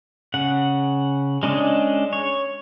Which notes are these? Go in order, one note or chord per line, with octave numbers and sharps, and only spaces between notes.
C#3 F#5
G#3 C#4 D4 D#5
C#5